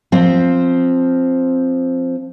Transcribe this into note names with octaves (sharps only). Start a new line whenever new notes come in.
F3 C4